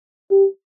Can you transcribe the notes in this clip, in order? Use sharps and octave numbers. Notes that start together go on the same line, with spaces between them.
G4